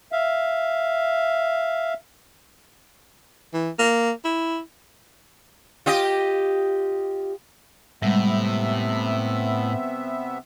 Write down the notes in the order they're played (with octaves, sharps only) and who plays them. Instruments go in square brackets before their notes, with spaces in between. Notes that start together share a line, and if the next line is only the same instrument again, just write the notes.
[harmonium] E5 F5
[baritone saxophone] E3
A#3
E4
[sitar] F4 G4 D#5
[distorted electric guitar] A2 [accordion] C3 B3 E5 [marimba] G3 G#3